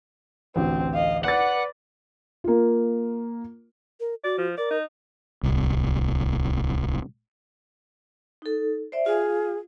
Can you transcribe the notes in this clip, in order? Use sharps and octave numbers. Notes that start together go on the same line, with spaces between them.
A1 D2 C4
D#5 F5
B4 D5 F#5 F#6 A6
A#3 F4
A#4
F#4 D5
F3
A#4 D5
D#4
D1 C2
D#4 A4
C5 D5 E5
F4 G#4 F5